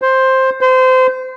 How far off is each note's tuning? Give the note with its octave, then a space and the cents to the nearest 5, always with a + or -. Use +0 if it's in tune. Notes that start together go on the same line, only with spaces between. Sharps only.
C5 +10
C5 -25